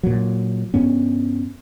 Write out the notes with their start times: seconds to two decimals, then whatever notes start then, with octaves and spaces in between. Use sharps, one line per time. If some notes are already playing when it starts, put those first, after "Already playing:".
0.03 A#2 F#3
0.74 G2 B3 C#4